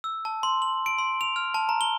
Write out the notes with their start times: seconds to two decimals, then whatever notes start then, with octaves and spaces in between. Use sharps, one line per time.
0.04 E6
0.25 A5
0.43 C6
0.62 F#7
0.86 D7
0.98 C6
1.21 F7
1.36 F6
1.54 A5
1.69 A#5
1.81 G7